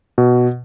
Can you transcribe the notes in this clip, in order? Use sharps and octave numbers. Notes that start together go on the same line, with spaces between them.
B2